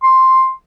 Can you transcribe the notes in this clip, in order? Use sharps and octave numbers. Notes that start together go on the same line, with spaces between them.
C6